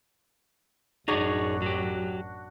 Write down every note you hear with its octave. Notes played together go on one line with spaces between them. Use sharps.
A1 F#2 D4 D#4 F#4 G#4 C#5 C#6
F#3 G4